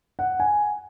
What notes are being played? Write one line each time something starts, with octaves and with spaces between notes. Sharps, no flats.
F#5
G#5